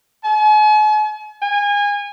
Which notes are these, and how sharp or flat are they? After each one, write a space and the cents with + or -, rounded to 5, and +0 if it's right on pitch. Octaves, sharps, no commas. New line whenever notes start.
G#5 +45
G#5 -25